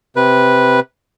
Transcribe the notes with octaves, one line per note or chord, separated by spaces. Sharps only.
C3 B4